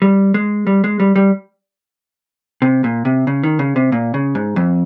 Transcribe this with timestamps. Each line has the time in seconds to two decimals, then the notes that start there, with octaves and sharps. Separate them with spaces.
0.02 G3
0.34 G#3
0.67 G3
0.84 G#3
1.00 G3
1.16 G3
2.62 C3
2.84 A#2
3.05 C3
3.27 C#3
3.43 D#3
3.59 C#3
3.76 C3
3.92 A#2
4.14 C#3
4.35 G#2
4.56 F2